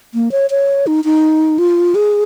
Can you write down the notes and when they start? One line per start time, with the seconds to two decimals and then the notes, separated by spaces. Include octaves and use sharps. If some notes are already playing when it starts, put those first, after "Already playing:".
0.14 A#3
0.32 C#5
0.50 C#5
0.87 D#4
1.05 D#4
1.59 F4
1.95 G#4